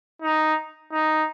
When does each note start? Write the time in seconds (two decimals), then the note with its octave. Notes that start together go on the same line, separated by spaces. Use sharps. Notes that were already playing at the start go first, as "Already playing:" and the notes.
0.22 D#4
0.92 D#4